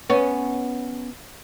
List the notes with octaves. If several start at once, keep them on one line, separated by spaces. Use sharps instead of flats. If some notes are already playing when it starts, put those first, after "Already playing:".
B3 C#4